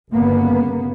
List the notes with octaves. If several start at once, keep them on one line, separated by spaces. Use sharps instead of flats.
G1 C#3 A#3 B3